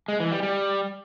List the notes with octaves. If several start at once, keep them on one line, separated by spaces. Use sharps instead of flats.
G#3
E3
G3
G3